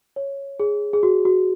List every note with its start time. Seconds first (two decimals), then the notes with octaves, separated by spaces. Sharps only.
0.16 C#5
0.60 G#4
0.93 G#4
1.03 F#4
1.25 F#4